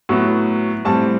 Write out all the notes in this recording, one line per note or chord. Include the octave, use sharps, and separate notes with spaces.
A2 F#3 B3
A2 G3 C4 A5